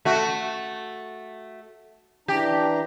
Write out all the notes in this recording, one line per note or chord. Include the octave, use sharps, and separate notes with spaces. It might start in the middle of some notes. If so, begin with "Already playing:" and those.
A3 F#4
E3 D4 G4 A#5